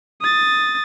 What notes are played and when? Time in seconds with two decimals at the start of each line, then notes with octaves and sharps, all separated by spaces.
0.22 D#6 A6